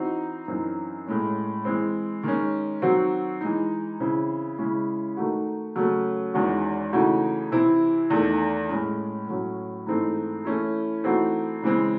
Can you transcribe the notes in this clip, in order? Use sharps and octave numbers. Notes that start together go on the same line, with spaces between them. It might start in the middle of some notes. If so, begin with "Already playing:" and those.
Already playing: E3 C4 D#4 F#4
F#2 E3 C4 D#4
A2 G#3 C#4
E3 G#3 C4
D#3 G#3 C#4
D#3 F#3 C4 F#4
E3 G#3 D#4
C#3 E3 C4 E4
C#3 G#3 C#4 E4
D#3 A3 D#4 F#4
C#3 F#3 A3 C#4
E2 D#3 G#3 C#4 F#4
C#3 E3 A3 D#4 F#4
C3 E3 C4 E4
E2 D#3 A3 D#4
A2 G#3 C#4
A2 F#3 C#4
G#2 E3 A3 C4 D#4
E3 A3 C#4 E4
E3 A3 C4 D#4 F#4
C#3 E3 G#3 C4